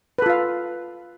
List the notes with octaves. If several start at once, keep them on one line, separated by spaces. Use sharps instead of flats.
F4 A4 B4 F5